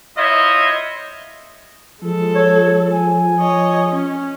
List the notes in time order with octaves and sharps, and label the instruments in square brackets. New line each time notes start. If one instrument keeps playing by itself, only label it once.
[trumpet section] E4 F4 C5 C#5 D#5 E5
[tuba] F3 [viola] G#3 A4
[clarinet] C#5
G#5
[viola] C#5 D#5
C#4